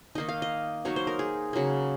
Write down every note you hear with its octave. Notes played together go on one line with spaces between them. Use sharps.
D#3 A#3 D#4 D#5
F5
D#5
F#3 A#3 D#4 C#5
C5
A#4
G#4
C#3 F#3 A#3